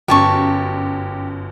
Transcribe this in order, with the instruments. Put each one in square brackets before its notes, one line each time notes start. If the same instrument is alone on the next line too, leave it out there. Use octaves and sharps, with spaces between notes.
[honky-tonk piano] G1 F#2 [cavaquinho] G4 A5 C#6